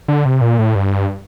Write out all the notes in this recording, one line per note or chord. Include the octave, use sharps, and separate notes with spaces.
D3
C3
A#2
A2
G2